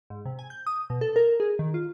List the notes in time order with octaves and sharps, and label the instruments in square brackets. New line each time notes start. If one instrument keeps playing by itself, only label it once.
[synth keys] G#2
C3
G#5
G6
D#6
B2
A4
A#4
G#4
D#3
F4